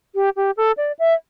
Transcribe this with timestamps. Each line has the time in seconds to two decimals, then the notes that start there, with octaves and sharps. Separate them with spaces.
0.15 G4
0.36 G4
0.57 A4
0.77 D5
0.99 E5